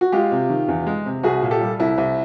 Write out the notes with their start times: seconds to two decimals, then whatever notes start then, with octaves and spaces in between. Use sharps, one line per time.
0.01 F#4
0.12 G#3 F4 G4
0.32 C3
0.50 D#3
0.69 E2
0.87 G#3
1.06 C3
1.23 C2 F#4 G#4
1.42 A#2
1.51 G4 A4
1.61 G3
1.80 C2 E4
1.98 C2